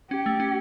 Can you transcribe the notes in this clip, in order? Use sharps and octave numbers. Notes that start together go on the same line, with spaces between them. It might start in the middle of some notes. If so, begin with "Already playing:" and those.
C#4 G4
A3
C#4